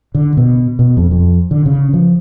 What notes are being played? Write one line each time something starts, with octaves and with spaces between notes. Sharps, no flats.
D3
B2
B2
F2
F2
D3
C#3
F3